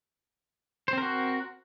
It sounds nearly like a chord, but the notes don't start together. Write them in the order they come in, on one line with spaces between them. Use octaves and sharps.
C5 C4 A#4 F#4